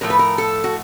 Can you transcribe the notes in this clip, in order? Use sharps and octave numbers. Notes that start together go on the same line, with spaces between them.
A2 F3 A3 A#4
B4
A#4
A4
F#4